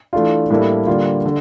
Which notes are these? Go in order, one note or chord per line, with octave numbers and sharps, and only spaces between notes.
E3 A3 D4 F4
A2 G3 A#3 E4 A4
D3 G3 A#3 F4
D3